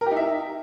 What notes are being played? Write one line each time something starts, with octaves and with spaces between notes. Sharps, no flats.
A#4
G4
D#4
E5